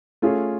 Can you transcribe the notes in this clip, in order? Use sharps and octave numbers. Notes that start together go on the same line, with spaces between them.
A3 C#4 F4 G#4